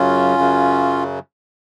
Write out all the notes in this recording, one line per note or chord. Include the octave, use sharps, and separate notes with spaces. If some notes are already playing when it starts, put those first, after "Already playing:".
Already playing: F#2 C#3 F#3 C#4 F4
F#2 C#3 F#3